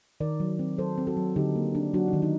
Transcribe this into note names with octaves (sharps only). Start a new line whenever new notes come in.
D#3 A#4 D5
F#3
C4
F#3 A4 C5
C4
F#4 A4
F#3
D3 D#4 G4
A#3
D4
F#3 D4 F#4
D#3 D#4
D#4